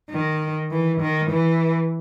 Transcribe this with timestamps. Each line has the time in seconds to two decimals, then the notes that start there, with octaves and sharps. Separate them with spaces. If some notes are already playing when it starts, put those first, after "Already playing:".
0.11 D#3
0.71 E3
1.01 D#3
1.30 E3